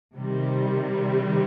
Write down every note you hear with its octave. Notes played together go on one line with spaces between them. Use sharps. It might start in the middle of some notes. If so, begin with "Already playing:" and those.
C3 D#3 G3